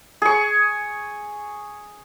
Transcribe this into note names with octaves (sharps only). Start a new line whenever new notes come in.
G#4 C#6